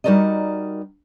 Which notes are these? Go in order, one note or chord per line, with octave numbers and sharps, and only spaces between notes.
G3 D#4 F#4 A#4 D5 D#5